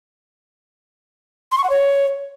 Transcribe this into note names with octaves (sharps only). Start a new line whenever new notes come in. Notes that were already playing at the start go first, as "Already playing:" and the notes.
C6
C#6
F#5
C#5